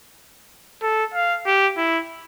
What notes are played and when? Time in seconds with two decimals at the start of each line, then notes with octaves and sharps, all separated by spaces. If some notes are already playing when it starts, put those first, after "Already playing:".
0.82 A4
1.14 F5
1.46 G4
1.77 E4